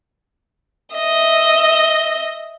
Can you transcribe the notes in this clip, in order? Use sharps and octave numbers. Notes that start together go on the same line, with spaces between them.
D#5 E5